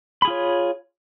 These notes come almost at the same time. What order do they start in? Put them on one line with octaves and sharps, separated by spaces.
B5 G#4 F4 C#5